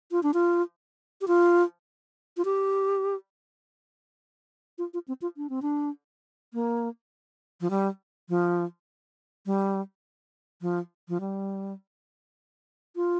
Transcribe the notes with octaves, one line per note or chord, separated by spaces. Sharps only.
F4
D4
F4
G4
F4
F4
G4
F4
F4
C4
F4
D4
C4
D4
A#3
F3
G3
F3
G3
F3
F3
G3
F4